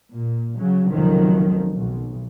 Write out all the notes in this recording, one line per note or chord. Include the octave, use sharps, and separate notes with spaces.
A#2
C#3 F#3
F1 C#2 D#3 F3 F#3
B1